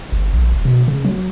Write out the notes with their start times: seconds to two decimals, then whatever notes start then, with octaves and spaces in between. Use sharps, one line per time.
0.12 G1
0.33 A#1
0.52 D#1
0.65 B2
0.88 C#3
1.05 F#3